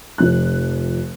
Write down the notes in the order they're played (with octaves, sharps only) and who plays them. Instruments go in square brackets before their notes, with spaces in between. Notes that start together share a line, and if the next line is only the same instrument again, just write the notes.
[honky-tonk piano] F1 F3 F#6